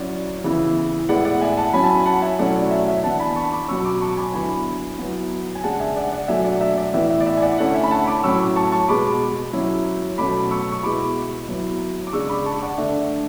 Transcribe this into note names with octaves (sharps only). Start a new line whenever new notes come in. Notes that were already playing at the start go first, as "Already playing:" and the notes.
Already playing: F#3 C#4 E4 D5 F#5
C#3 E3 B3 E4
A2 G#3 B3 E4 D5 F#5
D5 F#5
E5 G#5
F#5 A5
F#3 C#4 E4 G#5 B5
A5
G#5 B5
F#5 A5
E5 G#5
B2 F#3 A3 C#4 E4 D5 F#5
D5 F#5
E5
E5
E3 B3 D4 F#5 A5
G#5 B5
A5 C#6
B5 D6
B2 F#3 C#4 C#6 E6
B5 D6
A5 C#6
G#5 B5
D3 F#3 B3 E4 G#5 B5
F#3 B3 E4
G#5
C#3 G#3 D4 F#5 A5
E5 G#5
D5 F#5
D5 F#5
B2 F#3 A3 D4 E5 G#5
D5 F#5
E5
D5
A2 E3 B3 E4 E5
E5
D5
E5
G#5
D5 F#5
D3 A3 C#4 E4 D5 F#5
E5 G#5
B5
F#5 A5
B5 D6
A2 F#3 C#4 C#6 E6
A5 C#6
A5 C#6
B2 G#3 B3 B5 D6
F#3 C#4 E4
B2 F#3 A3 C#4 B5 D6
C#6 E6
C#6
B2 G#3 B3 E4 B5 D6
F#3 B3 E4
D6
C#3 G#3 D4 C#6 E6
B5 D6
A5 C#6
D5 F#5
D3 A3 D4 E5